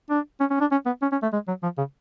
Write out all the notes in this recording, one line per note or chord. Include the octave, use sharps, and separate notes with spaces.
D4
C#4
C#4
D4
C#4
B3
C#4
C#4
A3
G#3
F#3
F3
C#3